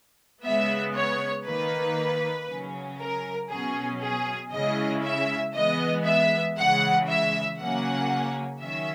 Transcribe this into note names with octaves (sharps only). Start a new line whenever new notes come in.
C#3 G#3 B3 E5
C#5
D#3 A#3 D#4 B4
C#3 F#3 C#4
A#4
B2 F#3 C#4 G#4
G#4
C#3 G#3 C#4 E4 D#5
E5
E3 G#3 B3 D#5
E5
C#3 E3 G#3 F#5
E5
C#3 F#3 A#3 C#4 F#5
D#3 F#3 C#4 E5